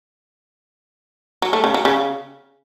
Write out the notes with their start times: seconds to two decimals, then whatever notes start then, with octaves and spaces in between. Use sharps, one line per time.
1.42 F#3
1.53 A3
1.64 C#3
1.74 F#3
1.85 C#3